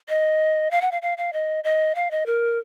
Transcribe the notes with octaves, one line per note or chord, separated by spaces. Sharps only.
D#5
F5
F#5
F5
F5
F5
D#5
D#5
F5
D#5
A#4